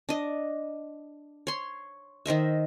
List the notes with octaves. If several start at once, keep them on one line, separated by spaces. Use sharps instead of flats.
D4 D#5
C#5 C6
D#3 C5 D#5 E5